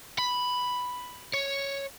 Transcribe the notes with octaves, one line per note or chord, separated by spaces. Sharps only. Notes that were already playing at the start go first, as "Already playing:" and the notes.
B5
C#5